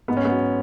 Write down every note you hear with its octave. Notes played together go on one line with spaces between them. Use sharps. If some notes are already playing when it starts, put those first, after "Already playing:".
G#2 B3
C#4
B3
F#3